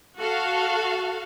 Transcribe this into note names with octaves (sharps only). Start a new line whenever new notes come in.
F#4 A4 F5